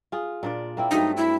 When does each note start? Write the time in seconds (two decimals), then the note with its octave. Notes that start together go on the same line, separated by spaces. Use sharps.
0.12 F4 G#4
0.43 A#2 D4 D5
0.77 A#3 C4 E4
0.91 G2 F#3 A3 D#4
1.17 E4